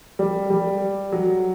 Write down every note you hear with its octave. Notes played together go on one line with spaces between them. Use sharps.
G3
G3
F#3